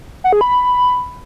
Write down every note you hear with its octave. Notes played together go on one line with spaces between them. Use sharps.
F#5
G#4
B5